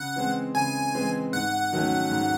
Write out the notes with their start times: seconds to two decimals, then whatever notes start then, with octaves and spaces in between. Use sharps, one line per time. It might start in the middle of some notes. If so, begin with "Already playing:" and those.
Already playing: C#3 F#5
0.16 E3 G#3 C4
0.55 C#3 G#5
0.94 E3 G#3 C4
1.33 G#2 F#5
1.73 D#3 F#3 A3 C#4
2.11 G#2